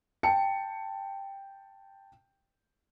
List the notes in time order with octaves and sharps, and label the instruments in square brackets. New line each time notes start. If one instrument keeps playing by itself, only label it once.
[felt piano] G5 A5 C#7